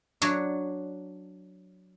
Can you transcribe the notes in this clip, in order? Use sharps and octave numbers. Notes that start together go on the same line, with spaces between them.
F#3 D4 C#5 D5